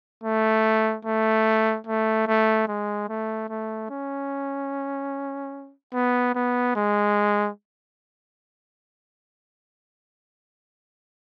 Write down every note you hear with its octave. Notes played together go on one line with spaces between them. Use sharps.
A3
A3
A3
A3
G#3
A3
A3
C#4
B3
B3
G#3